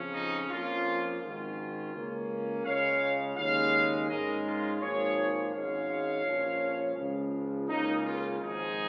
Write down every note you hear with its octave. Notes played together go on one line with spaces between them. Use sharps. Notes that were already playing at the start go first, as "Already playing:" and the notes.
Already playing: F2 C#3 F3 C#4
D#4
F2 F3 A#3 C#4 F4
G#1 G#2 D#3 C#4 F4
C#2 C#3 A#3 C#4
C#2 C#3 G#3 C#4 C#5 F5
D#2 C#3 G#3 C#4 C#5 F5
G#2 G#3 C#4 A#4 D#5
F4 A#4
G#1 G#2 F3 A#3 G#4 C#5
G#1 G#2 G#3 C#4 C#5 F5
A#1 A#2 F3 C#4
C#2 C#3 F3
C#2 C#3 A#3 C#4 D#4
F4
G#1 G#2 F3 D#4 G#4